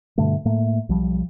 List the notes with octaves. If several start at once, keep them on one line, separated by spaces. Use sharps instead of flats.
G2 B2 D3 A3
A2 A3 A#3
B1 F3 G3